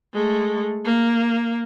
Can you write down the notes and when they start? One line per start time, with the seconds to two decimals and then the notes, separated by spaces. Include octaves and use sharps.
0.13 G#3 A3
0.85 A#3